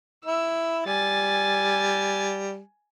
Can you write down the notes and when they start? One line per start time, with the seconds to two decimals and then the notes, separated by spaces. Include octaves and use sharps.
0.25 E4 E6
0.86 G3 G#5 A6